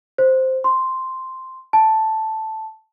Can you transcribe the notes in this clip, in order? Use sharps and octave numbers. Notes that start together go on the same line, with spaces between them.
C5
C6
A5